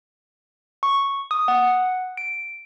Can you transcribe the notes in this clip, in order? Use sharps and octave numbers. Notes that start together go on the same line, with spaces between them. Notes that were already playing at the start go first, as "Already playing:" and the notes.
C#6
D#6
F#5
D7